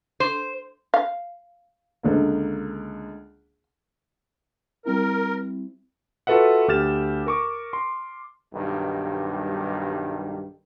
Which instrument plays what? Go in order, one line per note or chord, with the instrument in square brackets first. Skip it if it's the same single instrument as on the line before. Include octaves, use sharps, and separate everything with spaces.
[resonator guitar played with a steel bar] C5
[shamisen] F5
[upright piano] C#2 D3 A#3
[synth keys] G3 C4 E4 [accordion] A#4
[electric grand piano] F4 F#4 A4 B4 E5 F#5
D2 G4 F6 A6 E7
A#4 C#6 D6
C6
[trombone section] B1 G2 D#3 G3